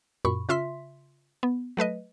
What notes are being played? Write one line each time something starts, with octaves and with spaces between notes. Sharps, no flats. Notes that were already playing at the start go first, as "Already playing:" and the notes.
F#2 A#2 B5 C#6
C#3 F4 E5 C6 B6
B3
F#3 A3 B4 D#5